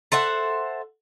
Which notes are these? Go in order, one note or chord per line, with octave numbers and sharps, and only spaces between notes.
A4 C5 E5 F#5